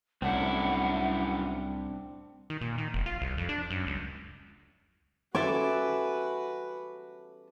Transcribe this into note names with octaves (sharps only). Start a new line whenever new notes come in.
C2 F#2 A2 C4 D4 E4 F#5
D#3
A#2
D#3
F1
F4
C2
F2
D4
F#2
C#2
F#4 A4 B4 E5 G#5 D6